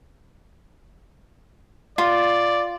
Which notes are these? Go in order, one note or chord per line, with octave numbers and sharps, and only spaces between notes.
F4 D5